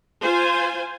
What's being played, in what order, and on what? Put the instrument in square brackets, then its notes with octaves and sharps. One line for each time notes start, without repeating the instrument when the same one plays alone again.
[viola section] F4 C5 G#5